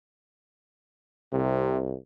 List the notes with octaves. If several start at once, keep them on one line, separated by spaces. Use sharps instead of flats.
C2 C3